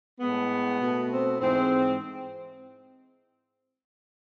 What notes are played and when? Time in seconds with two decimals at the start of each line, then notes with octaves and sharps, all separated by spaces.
0.20 A2 G#3 B3
0.80 B2 A3
1.11 C4
1.41 G#2 E3 G#3 C4